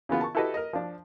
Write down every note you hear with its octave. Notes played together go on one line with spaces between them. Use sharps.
C#3 E3 B3 F4
A5 C#6
E4 F#4 G4 A4 B4 D#5
A#4 D#5
F3 D4